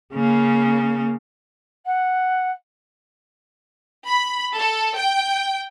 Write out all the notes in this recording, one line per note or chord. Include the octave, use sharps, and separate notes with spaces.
C#3 A#3
F#5
B5
A4
G5